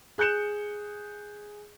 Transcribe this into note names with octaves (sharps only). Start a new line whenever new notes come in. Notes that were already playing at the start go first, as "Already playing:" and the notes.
G#4 F#6 G6 C#7 E7